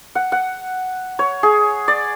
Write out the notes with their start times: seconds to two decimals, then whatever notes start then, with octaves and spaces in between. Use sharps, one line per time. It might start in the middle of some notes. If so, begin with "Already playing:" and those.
0.15 F#5
0.32 F#5
1.19 C#5
1.43 G#4
1.88 D5